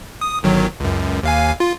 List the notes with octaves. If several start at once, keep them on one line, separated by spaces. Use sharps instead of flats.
D#6
G1 D#3 F#3
C#2 F#2
D#2 F5 G#5
F4